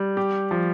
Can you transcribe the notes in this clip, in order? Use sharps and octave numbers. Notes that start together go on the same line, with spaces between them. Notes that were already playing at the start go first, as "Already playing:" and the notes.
Already playing: G3
G4
F3